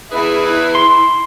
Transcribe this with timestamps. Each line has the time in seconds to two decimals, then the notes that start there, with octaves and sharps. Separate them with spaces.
0.12 E2 E4 G#4 B4
0.44 E4
0.75 C6